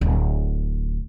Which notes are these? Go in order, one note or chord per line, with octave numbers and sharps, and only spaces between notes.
D1